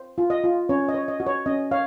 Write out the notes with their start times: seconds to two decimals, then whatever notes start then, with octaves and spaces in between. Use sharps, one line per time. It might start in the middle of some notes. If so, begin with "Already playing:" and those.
Already playing: C5
0.18 F4
0.30 D#5
0.44 F4
0.69 C#4 C#5
0.88 D#5
0.94 C#5
1.08 D#5
1.20 F#4
1.27 C#5
1.46 C#4 D#5
1.71 C#5 F5